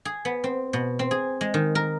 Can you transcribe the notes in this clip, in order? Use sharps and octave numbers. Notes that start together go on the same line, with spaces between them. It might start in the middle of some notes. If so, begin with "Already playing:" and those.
G#4
B3
C4
B2
C4
G#4
G#3
D#3
A#4